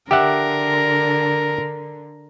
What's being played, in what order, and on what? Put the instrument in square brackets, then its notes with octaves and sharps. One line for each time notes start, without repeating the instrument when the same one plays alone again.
[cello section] D3 [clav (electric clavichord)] G4 E5 F#5 [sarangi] A#4